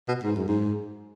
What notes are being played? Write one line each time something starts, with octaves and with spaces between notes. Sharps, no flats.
B2
G#2
F#2
G#2